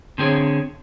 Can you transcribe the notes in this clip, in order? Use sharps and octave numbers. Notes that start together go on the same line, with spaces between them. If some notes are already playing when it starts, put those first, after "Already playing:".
D3 C4 G#4 C#5